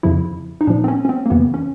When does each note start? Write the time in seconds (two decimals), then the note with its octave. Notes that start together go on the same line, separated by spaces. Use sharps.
0.03 F2 C#3 F3 E4
0.61 D#4
0.67 A#2 F3 D4
0.84 C4
0.88 C#4
1.05 C#4
1.09 C4
1.26 A#3
1.30 F2 C#3 E3 B3
1.54 C#4